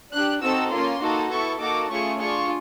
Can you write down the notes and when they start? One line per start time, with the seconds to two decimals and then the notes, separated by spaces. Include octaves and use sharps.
0.13 D4 G4 F#6
0.42 C4 D#4 F#4 A4 E6
0.72 A#3 C#4 F4 C6
1.01 A#3 D#4 F#4 A4
1.31 B3 E4 A4 C#6
1.60 A#3 D#4 F#4 A4 D6
1.90 A3 C#4 F4 G#4 C#6
2.20 D4 F4 G#4 C#6